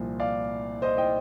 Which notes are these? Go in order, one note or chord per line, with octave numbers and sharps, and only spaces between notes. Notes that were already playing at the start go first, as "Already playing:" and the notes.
Already playing: C2 A#2 F3 C4
D5 F5
C5 D#5
D#5 G5